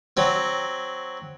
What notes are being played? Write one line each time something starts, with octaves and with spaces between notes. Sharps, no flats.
F#3 C4